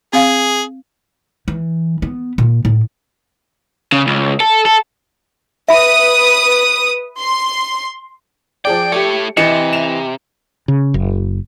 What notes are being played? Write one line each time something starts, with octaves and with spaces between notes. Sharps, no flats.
C4 G#4 F5
E3
B3
A#2
A2
C#3
C#2
A4
A4
B4 E5 B5 D#6
C6
F3 G#4 D5 G5
A3 G4 A4 C#5 C#7
C3 E3 D#5 C#7 E7
E7 F7
C#3
F#1